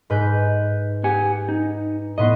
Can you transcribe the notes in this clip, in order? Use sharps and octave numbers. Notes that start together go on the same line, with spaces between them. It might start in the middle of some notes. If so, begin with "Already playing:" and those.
G#2 B4 G6
G4 F#5 G#5
D#4
A2 B3 D#5 C6